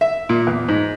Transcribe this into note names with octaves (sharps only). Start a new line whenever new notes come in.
E5
A#2
E2
G#2